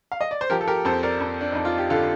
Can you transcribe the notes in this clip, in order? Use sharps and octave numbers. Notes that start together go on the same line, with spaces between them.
F5
D#5
D5
C5
F3 G4 A#4
A4
G4 A#4
F2 A4 C5
A#4 D5
F2
D4
F2 D#4
F4
G4
D3 F4 A4